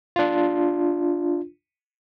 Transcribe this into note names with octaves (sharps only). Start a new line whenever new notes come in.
D4 F4